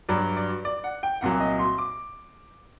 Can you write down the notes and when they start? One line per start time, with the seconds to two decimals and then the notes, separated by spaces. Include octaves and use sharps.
0.09 G2 F#3 D5
0.37 D5
0.65 D5
0.84 F#5
1.03 G5
1.21 C2 A#2 F#3 F#5
1.40 D#5
1.59 C6
1.78 D6